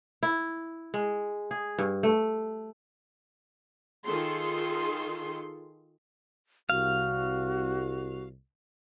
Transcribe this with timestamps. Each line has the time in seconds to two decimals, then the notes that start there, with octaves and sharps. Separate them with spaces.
0.23 E4
0.94 G#3
1.51 G#4
1.79 G2
2.03 A3
4.04 D#3 F4 G#4 A4 C6
6.70 C2 F#4 F5